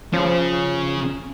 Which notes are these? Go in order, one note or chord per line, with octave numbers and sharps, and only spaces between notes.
F3 C#4 G#4